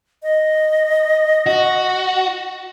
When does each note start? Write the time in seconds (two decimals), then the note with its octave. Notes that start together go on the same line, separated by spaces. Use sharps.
0.23 D#5
1.46 F#4